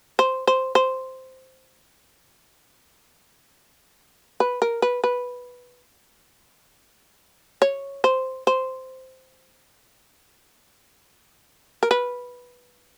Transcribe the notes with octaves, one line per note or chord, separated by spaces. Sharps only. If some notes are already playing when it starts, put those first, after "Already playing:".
C5
C5
C5
B4
A#4
B4
B4
C#5
C5
C5
A#4
B4